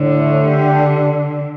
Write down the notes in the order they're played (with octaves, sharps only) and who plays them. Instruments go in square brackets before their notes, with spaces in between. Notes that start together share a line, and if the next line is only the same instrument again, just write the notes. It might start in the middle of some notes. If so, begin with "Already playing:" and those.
Already playing: [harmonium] A2 [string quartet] D3
[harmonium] A3
G4
D4